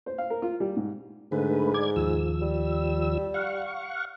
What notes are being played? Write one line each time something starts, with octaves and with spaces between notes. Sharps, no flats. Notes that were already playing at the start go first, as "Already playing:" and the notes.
C5
F5
A#4
F4
G3
G#2
G#2 D3 A3 B4
D5 G#6
D#2 F3 E6
G3
F5 F#5 C#6